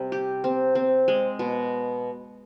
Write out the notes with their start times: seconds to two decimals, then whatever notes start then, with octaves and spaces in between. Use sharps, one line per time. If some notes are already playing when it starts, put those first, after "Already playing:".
Already playing: C3 G3
0.12 G4
0.44 C4
0.75 C4
1.08 G#3
1.39 B2